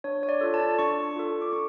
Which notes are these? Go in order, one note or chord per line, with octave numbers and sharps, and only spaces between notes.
D4 C#5
C#5
D5
F4 A4
A5
D4 C#6
F4 A4
D6
D4 C#6